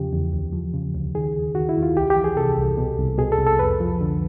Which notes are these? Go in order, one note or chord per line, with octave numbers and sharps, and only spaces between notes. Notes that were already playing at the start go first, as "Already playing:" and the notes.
Already playing: E2 C#3 F3 G4
E2
D2
F3
C#3
D2
D#3 G#4
D#2
D#3 F#4
E4
D#2
F4
C2 G4
G4
E3
G#4
C3 A4
C2
B2
C2
B2 G#4
A4
C2
A4
F2 B4
F3
D3